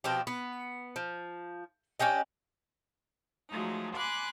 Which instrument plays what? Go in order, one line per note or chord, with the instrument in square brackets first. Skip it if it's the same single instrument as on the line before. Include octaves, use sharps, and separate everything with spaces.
[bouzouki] B2 F3 C4 G4
B3
F3
C#4 D4 G4 D#5
[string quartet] F3 F#3 G#3 A3 D#4
G#5 B5 C6 D6 F#6